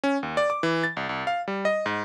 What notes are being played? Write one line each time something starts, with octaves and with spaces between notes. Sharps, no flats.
C#4
D#2
D5
D6
E3
A6
C2
C2
F5
G3
D#5
G#2